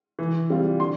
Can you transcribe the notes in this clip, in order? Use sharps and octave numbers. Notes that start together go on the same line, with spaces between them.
E3
G3 C4 F4
D3 C6